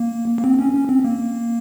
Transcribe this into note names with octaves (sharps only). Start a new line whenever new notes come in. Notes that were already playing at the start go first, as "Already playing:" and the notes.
Already playing: A#3
A#3
C4
C#4
C#4
C4
A#3